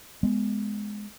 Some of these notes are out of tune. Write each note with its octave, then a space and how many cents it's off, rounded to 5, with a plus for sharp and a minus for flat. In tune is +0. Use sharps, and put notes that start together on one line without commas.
G#3 +0 B3 +5